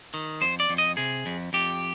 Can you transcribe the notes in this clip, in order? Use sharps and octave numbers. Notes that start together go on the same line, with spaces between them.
D#3
F2 C5
D5
F2
D#5
C3 G#4
F2
F2 G4